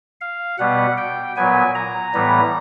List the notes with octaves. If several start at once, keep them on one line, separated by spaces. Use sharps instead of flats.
F5
B2 G3 B3 F#5
G5
A#2 F#3 B3 G#5
A#5
A2 E3 G3 B3